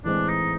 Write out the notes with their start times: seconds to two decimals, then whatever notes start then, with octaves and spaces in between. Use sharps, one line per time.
0.04 A2 E3 G#3 C4 D4
0.28 D#4